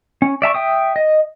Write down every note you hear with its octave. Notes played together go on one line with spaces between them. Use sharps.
C#4
D5 E5 A5 C#6
E5 G5 D#6
D#5